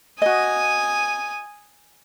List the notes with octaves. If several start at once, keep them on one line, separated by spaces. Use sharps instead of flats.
F#4 D#5 G#5 D#6